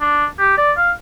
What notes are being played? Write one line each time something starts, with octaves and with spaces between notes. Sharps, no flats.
D4
G4
D5
F5